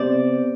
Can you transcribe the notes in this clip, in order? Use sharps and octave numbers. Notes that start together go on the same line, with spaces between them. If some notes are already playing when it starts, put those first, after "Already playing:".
Already playing: C3 B3 C5 D5